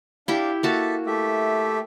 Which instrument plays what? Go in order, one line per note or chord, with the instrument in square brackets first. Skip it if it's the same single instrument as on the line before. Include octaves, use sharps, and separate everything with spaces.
[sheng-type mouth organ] D4 F5 [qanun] E4 G4 G5
[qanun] A#3 F#4 A5 [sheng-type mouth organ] G4 A4 E5
[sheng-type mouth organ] A3 G4 E5